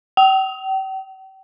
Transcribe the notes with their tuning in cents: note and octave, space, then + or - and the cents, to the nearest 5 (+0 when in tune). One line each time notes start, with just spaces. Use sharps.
G5 -40